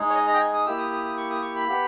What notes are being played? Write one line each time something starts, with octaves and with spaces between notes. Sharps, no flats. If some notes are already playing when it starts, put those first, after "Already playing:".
Already playing: G#3 D#4 G#4
C#5
D#5
A#5
G5
G#5
D#6
A#3 E4 G4 E6
D#6
D#6
D#6
C#6
D#6
C#6
B5
B3 G4